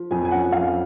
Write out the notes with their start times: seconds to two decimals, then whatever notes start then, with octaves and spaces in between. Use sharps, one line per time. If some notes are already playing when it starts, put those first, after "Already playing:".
Already playing: F3
0.11 F2 G#5
0.25 G#5
0.31 C#4 F#5
0.52 F2 F5